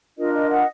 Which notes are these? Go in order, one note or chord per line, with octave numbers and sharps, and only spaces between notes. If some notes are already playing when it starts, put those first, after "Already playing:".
D4 F4 A#4 D#5
D#5
D#5 F#5